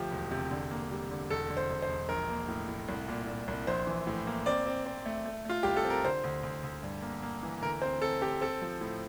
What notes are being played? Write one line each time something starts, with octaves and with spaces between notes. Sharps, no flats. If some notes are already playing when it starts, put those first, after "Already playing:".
Already playing: D2 F3 A3 G4
E1
C3
D3
A#3
G3
D3
E1 A4
D3
C5
E1
C5
E1
A#1 A#4
A#3
A2
A2
C2
A#2
A#2
C2
A#1 C5
E3
A2
A#3
C4 D5
C4
C4
A3
A3
A3 F4
C2 G4
A4
C4
A#4
D3 C5
D2
D2
D2
G2
A#3
A#3
E3
D2 A#4
C4 C5
C4 A4
C4 G4
C4 A4
F3
A2